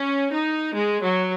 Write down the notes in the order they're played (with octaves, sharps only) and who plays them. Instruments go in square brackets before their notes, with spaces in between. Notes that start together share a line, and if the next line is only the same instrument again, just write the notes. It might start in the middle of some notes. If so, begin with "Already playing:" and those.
Already playing: [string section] C#4
D#4
G#3
F#3